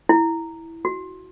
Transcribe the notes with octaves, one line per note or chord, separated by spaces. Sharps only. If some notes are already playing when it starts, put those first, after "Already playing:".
E4
F#4